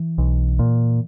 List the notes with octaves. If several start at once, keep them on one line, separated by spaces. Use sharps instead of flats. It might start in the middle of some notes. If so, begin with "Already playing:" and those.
Already playing: E3
B1
A#2